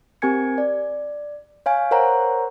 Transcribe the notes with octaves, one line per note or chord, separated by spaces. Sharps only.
C4 G4 A#4 G#5 G#6 C#7
D5
C#5 F5 G#5
A#4 C5 C#5 F#5 A#5